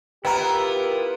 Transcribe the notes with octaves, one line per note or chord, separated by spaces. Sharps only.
B3 E4 F4 G4 A#4 G5 A#5